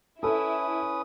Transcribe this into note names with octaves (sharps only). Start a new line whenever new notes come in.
C#4 E4 A4 B4 D#6